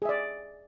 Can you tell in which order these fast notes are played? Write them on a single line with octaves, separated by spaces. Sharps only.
G#4 E5 D5